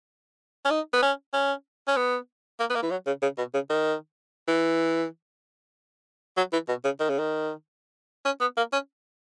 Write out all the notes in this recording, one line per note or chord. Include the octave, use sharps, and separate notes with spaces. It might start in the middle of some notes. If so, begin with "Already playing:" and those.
C#4
D#4
B3
C#4
C#4
C#4
B3
A#3
B3
A#3
E3
F#3
C#3
C#3
B2
C#3
D#3
E3
F#3
E3
B2
C#3
D#3
C#3
D#3
C#4
B3
A#3
C#4